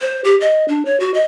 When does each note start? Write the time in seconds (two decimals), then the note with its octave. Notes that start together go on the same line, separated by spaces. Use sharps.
0.01 C5
0.24 G4
0.41 D#5
0.68 D4
0.85 C#5
1.00 F#4
1.14 D#5